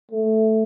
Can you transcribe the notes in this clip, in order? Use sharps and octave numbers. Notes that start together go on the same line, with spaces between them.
A3